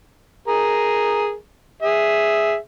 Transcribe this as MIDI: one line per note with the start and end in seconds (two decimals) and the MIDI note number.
0.48 1.34 68
0.48 1.34 70
1.82 2.56 68
1.82 2.56 76